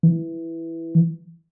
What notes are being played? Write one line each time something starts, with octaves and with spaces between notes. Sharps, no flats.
E3